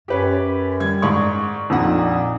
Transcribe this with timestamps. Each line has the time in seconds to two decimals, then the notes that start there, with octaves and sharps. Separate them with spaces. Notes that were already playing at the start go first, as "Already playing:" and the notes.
0.08 F#2 G4 B4 C#5
0.80 G3 G#6
1.02 G#2 D5 C#6
1.70 A#1 F2 A#2 D#4 F#5